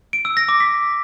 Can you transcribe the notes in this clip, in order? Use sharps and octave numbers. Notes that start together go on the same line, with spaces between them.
D7
E6
A#6
D6
B6